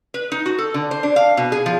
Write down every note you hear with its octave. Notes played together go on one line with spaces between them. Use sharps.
B4
D#4
F#4
A4
D3
C5
D4
F5
B2
G#4
F3